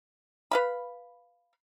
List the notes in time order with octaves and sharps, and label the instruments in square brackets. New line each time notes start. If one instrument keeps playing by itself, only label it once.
[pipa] B4 F5 B5